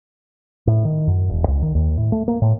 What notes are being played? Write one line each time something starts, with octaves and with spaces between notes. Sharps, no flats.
A2
D#3
F#2
E1
C#2
D#3
D#2
A2
A3
A#3
A2